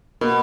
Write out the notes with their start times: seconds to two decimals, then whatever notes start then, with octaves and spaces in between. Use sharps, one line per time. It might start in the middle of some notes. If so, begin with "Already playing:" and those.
0.21 B2 A#3